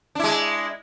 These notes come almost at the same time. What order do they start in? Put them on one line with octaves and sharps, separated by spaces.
D4 E4 G#3